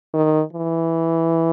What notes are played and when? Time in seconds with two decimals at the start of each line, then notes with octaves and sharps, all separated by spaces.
0.14 D#3
0.53 E3